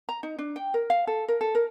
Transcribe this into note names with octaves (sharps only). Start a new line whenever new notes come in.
A#5
D#4
D4
G5
A#4
F5
A4
A#4
A4
A#4